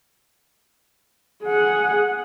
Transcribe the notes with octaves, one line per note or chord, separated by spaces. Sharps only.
G#4 F#5